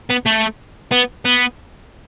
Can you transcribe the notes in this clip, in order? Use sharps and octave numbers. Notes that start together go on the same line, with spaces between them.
B3
A3
B3
B3